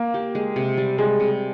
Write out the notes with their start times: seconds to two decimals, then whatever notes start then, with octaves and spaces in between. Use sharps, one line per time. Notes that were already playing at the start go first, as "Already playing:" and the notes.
Already playing: A#3
0.14 G4
0.35 G#3
0.56 C3
0.77 G3
0.98 G3 G#3
1.20 C3